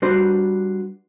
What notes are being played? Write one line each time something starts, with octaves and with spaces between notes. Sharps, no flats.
G3 D4 F#4 B4 C5